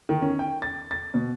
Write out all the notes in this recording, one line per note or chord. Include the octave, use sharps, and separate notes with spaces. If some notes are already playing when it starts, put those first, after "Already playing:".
D#3
C#4
G5
A6
A6
B2